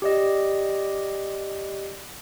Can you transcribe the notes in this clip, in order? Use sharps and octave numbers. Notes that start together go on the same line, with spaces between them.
G4 D5 D#5